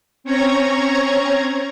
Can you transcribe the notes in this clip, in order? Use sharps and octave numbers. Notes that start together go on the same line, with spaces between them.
C4 C#4 C#5 A#5 C#6 G#6